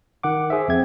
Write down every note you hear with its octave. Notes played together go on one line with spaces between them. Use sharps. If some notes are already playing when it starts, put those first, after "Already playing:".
D#3 F#5 D6
G#4 C5 E5
F2 C4 G#6